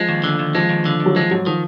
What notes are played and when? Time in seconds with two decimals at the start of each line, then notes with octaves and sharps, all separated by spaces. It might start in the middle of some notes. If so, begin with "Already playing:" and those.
Already playing: F3 G#3
0.09 D#2
0.24 D3
0.39 D#2
0.55 F3 G#3
0.69 D#2
0.85 D3
1.00 D#2
1.06 F#3
1.16 F3 G#3
1.31 G#2 F#3
1.46 D#3 F3